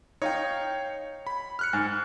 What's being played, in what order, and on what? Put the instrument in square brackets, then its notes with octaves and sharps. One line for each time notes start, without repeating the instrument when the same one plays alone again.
[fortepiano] D#4 [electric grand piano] C#5 F5 G5
[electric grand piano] B5
F6 F#6 C#7
[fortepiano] G#2